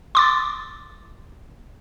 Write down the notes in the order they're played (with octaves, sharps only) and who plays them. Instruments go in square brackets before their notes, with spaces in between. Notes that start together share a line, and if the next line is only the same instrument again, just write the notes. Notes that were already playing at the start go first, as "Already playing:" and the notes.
[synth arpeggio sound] C6 D6 A6